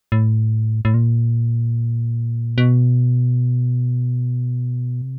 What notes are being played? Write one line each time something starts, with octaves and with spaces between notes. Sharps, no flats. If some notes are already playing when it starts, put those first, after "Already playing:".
A2
A2
A#2
B2
C3